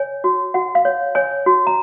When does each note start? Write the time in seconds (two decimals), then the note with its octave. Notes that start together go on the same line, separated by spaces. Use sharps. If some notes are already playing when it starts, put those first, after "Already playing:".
Already playing: C#5 G#5
0.24 F#4
0.54 F#4 F#5
0.75 F5
0.85 C#5
1.15 C#5 G#5
1.46 F#4
1.67 A#5